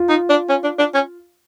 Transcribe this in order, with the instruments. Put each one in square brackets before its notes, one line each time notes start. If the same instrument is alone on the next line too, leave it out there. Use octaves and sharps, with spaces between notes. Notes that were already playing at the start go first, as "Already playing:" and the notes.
Already playing: [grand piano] F4
[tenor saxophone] D#4
D4
C#4
D4
D4
C#4